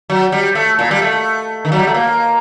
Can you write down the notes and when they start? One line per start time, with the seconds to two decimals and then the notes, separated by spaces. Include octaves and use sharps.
0.10 F#3
0.32 G3
0.55 A3
0.79 A#2
0.91 G3
1.02 A3
1.65 D#3
1.72 F#3
1.79 G3
1.87 A3
1.94 A#3